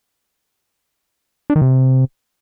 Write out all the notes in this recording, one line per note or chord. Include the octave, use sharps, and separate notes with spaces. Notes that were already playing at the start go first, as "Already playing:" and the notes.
D4
D#3
C3